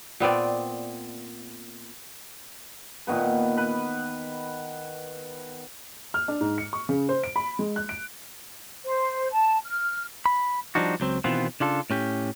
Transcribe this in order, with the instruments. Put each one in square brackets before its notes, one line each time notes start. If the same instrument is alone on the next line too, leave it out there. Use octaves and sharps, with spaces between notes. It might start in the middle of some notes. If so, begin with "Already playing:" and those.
[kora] A#2 B3 C4 D5
[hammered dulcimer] A#2 D#3 B3 B4
B4
[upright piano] F6
D4
G#2
C#7
C#6
C#3
C5
D7
B5
G#3
F#6
D7
[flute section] C5
A5
F6
[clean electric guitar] B5
F3 G3 D4 D#4 F#4
C#2 F#3 C4
B2 D#3 E3 B3 C4 F4
C#3 D4 F4 A4
A2 C#4 G4